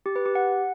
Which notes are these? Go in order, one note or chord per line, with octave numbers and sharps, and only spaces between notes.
G4
B4
G4
F#5